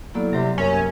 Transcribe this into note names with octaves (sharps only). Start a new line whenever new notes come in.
F#3 A#3 B3 E4 A4 D5
C3 F#3 G3 B3 G4 C5 A#5
F#2 C#4